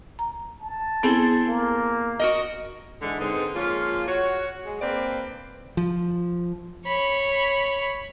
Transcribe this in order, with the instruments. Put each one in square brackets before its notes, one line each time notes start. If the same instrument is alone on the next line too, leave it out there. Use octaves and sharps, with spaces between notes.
[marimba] A#5
[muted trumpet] A5
[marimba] B3 E4 [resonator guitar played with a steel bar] C4 G#4 A4
[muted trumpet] A#3
[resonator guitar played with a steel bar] F#4 A#4 D#5
[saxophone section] G#2 D3 E3 G#3
G#2 D3 G#3 B3 C4 D#4
F3 G#3 A#3 C#4 F4
F#4 C#5
G#3
A#3 C4 D4 B4 D5
[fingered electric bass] F3
[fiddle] C#5 B5